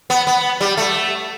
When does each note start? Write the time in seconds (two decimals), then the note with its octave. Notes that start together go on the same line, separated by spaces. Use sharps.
0.10 B3
0.27 B3
0.61 G3
0.77 A3